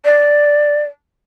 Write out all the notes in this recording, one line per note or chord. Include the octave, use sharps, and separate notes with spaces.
D5